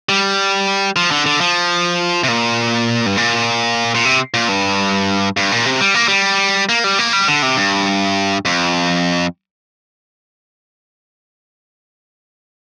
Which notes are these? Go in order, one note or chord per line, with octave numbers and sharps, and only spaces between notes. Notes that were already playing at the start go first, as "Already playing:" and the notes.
G3
F3
D3
D3
F3
C3
A#2
G2
A#2
A#2
C3
A#2
G2
G2
A#2
C3
G3
A#3
G3
A#3
G3
A#3
G3
D3
C3
G2
F2